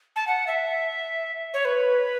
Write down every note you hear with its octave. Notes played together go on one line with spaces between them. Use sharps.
A5
F#5
E5
C#5
B4